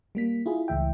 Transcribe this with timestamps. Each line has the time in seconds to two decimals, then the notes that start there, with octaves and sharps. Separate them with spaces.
0.15 G3 A#3 B6
0.46 E4 F4 G#4
0.68 C#2 A2 E3 E5 G5